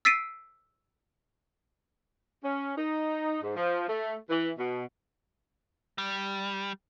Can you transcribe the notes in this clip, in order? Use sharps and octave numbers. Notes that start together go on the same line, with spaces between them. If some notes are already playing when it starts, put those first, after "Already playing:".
E6 A6 B6 C7 D7 D#7
C#4
D#4
G#2
F3
A3
E3
B2
G3